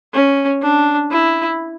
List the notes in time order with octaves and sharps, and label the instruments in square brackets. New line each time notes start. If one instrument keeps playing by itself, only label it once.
[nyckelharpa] C#4
D4
E4